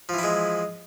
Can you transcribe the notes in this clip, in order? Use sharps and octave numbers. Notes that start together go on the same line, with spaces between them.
E3 F3 G#3 E4